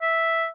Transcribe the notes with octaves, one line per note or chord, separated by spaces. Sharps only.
E5